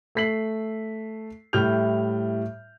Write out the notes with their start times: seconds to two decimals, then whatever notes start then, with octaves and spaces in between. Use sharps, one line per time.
0.15 A3 A4 B6 C7 F#7
1.53 A2 G3 E4 F6 G6 F7